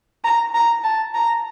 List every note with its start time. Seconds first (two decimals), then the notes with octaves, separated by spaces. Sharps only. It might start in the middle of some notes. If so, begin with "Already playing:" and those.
0.24 A#5
0.54 A#5
0.84 A5
1.15 A#5